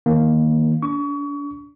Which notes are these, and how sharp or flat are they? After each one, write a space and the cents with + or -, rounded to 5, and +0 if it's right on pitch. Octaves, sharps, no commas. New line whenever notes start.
D#3 +0 A#3 +0
D4 -35 C#6 +35